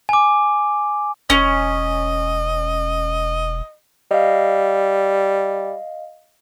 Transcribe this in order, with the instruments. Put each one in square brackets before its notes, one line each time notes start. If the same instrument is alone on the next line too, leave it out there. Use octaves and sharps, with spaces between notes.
[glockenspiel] G#5 D6
[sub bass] E1 [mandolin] C#4 [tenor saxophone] D#5
[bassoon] G3 [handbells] D#5 F5